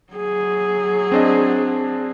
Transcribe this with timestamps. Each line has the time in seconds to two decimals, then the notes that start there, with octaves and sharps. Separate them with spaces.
0.13 F#3 G#4
1.12 C4 D4 D#5